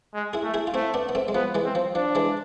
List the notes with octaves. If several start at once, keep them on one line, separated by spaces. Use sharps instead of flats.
G#3
E4 G#4
A3
E4 G#4
F4
A3 C4 E4
B3 D4
B3
A3 C4
G#3
F3 B3
E3 G#3
C4
F3
F3 D4
E3 G#3